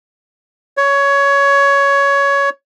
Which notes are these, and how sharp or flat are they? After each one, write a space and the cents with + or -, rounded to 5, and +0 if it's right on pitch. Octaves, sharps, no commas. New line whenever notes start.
C#5 +15